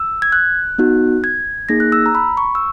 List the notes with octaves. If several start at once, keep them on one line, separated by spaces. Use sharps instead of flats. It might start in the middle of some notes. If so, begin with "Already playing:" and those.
Already playing: E6
G#6
F#6
B3 D#4 F#4
G#6
A#3 D#4 G#4 A#6
F#6
E6
A#5
B5
C#6
E6